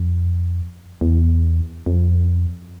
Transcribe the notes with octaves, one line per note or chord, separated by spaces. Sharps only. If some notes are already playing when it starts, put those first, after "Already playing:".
Already playing: F2
E2
F2